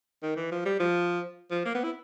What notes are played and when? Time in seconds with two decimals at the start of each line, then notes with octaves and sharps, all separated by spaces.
0.23 D#3
0.37 E3
0.52 F3
0.65 G3
0.80 F3
1.51 F3
1.65 A#3
1.75 B3
1.84 E4